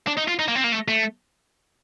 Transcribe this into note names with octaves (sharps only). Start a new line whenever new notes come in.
D4
D#4
F4
D#4
A#3
C4
A#3
A3
A3